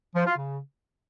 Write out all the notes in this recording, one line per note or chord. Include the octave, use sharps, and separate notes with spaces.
F3
F4
C#3